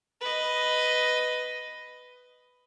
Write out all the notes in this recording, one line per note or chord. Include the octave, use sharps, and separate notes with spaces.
B4 D#5